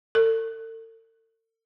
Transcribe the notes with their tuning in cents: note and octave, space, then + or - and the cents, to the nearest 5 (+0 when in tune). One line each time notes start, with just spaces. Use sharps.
A4 +45